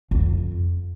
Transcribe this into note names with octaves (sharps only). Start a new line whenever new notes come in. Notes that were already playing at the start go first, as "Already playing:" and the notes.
F2